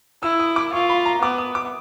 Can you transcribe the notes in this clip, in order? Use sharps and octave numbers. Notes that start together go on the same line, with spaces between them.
E4 E6
D#6
D6
F4 C#6
B5
A#5
B3 D6
D#6
D6